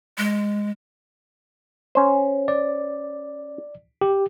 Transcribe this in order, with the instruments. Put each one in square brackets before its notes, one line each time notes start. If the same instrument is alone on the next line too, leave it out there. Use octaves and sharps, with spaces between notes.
[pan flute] G#3
[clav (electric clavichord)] C#4 C5
[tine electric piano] D5
G4